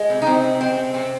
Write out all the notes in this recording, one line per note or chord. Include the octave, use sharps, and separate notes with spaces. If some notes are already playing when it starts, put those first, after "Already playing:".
Already playing: G#3
C3
D#4
C3 C4
C3
G#3 C4
C3
C3 C4